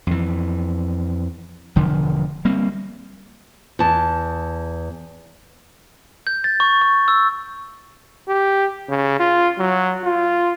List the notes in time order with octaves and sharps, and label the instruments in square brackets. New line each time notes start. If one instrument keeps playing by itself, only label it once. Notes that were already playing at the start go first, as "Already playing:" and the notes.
[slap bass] F2 E3
E1 D3 F3
G3 A#3 C4
[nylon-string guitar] E2 A5
[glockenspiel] G6
A6
C#6
C#6
E6
[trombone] G4
C#3
F4
F#3
F4